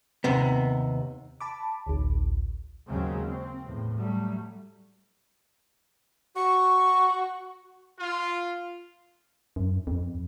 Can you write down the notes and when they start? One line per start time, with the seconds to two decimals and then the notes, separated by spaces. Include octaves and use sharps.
0.24 D#2 C3 B3
1.40 A5 B5 D6
1.86 A1 D2
2.88 D#2 C#3 F#3 G#3 C4
3.24 C4
3.64 E2 A2
3.95 F#3 G3 A3
6.36 F#4 C#6
8.00 F4
9.56 F#2
9.87 F2